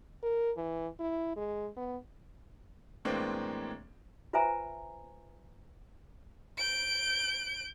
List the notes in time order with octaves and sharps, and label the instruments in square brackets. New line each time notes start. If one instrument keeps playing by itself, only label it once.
[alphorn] A#4
E3
E4
G#3
B3
[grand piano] A2 E3 G#3 A#3 C4 D4
[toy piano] F4 B4 C5 E5 G#5 A#5
[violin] G6 D7